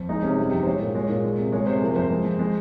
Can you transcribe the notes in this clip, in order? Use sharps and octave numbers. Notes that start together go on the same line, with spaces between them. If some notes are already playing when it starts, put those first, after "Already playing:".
Already playing: F2
G#3 D#4
C3 C#4
G3 D#4
F2 G4
C5
G#3 C#5
A#2
G#3 C#5
A#2
G#3
C3
G#3 C#5
C3 C5
G#4
F3 A#4
F2 C5
G#3
F2
G#3